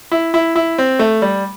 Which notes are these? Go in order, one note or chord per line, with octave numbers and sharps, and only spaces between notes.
E4
E4
E4
C4
A3
G3